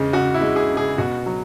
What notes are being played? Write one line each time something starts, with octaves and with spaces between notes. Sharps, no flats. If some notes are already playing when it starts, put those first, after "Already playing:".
Already playing: E2 C#3 G#3
C#3 F#4
E4
G#3
G#4
C#3
G#4
B2 F#4
F#3